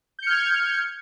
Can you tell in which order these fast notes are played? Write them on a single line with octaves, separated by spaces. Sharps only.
G6 C#7 F6 G#6